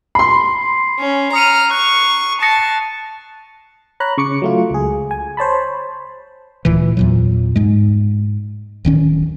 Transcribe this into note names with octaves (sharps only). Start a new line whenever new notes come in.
B5 C6 C7
C#4
A#5 D#6 F6 C#7 D#7
C#6 F#6
A5 D#6 A#6 C#7
C#5 A#5 B5 F#6
C#3 C#6 D6 C#7
F#3 A3 F4
C#2 G#4
G#5
C5 C#5 A5 B5
D1 D2 A#2 E3
E2 A#2 F#3
G#2 G#3
D1 D#3 C#4